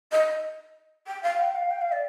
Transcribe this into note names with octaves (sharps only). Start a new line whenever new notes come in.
D#5
G5
F5
G5
F5
G5
F5
D5